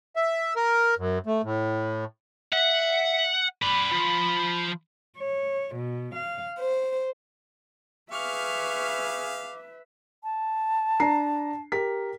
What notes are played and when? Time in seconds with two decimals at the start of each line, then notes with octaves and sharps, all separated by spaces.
0.16 E5
0.56 A#4
0.98 F#2
1.26 A3
1.44 A2
2.52 E5 F#5
3.62 B4 D5 B5
3.92 F3
5.18 C#5
5.76 B2
6.15 F5
6.59 C5
8.12 G#4 B4 E5 F5 C#6 D6 F6
10.23 A5
11.00 D4 A#5 C7
11.72 G4 A#4 B6